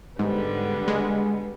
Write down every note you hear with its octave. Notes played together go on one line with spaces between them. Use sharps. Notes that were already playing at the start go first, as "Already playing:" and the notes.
G#2 D3 G3 B3
G#3